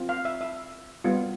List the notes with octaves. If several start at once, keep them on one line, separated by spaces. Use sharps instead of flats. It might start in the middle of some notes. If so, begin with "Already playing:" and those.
Already playing: C4 F4
F5
E5
E5
G3 B3 F4